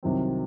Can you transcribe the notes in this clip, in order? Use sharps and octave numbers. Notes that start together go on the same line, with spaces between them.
C2 C3 D#3 F#3 C4